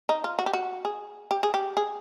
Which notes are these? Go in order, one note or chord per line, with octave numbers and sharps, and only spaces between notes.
D#4
F4
F#4
G4
F#4
G#4
G4
G#4
G4
G#4